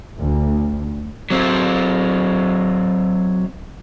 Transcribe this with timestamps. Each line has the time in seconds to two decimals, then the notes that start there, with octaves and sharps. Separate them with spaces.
0.19 D2
1.31 F#3 C4